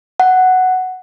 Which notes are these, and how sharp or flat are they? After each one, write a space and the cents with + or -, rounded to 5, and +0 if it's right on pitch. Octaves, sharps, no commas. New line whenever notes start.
F#5 +0